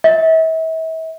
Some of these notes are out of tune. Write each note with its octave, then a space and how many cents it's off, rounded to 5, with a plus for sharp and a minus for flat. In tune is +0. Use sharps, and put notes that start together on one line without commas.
E5 -40